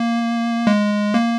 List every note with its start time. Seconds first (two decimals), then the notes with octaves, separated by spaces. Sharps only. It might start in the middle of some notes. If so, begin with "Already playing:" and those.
Already playing: A#3
0.67 G#3
1.14 A#3